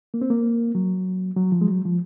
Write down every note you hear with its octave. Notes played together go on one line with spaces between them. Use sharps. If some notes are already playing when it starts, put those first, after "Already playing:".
A#3
C4
A#3
F#3
F#3
F3
G#3
F#3
F3